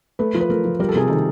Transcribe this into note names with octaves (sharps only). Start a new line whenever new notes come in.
A3 B4
F3
B4
A3 A#4
F3
G3 A#4
A4
C3 G#4
D#3 A4